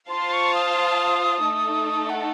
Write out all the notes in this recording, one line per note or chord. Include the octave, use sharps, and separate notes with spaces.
F4 C5 F5 A5 C6
C#6
D#6
A3 D#4 A4
F#5